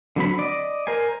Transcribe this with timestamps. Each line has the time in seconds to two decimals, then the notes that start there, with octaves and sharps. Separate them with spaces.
0.16 D3 F#3 C4 B5
0.39 D5 D#5
0.87 A#4 C5 G#5